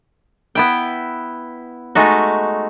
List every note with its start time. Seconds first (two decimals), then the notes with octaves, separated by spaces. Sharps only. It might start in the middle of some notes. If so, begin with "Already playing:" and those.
0.55 B3 E4 G5
1.95 G#3 A3 D#4 F#4